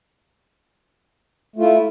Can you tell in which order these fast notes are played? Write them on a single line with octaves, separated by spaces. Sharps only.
A3 F4 E4